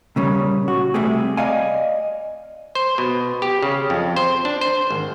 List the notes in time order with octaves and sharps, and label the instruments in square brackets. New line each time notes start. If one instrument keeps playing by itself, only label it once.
[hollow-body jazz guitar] A#2 C#3 G3
F#4
C3 G3 A3 C4 G#4
D5 D#5 F5 G#5
[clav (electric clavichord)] C5
B2
G4
C#3
F2
C5
D4
C5
G#1